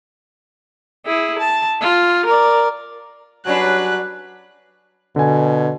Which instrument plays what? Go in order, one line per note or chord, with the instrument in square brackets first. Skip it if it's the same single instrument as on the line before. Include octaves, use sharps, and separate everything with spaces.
[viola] E4 G#4
A5
F4
A#4 D5
[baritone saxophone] F#3 [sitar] G3 C#4 D4 [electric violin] B4 F#6
[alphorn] B2 [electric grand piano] D3 G#5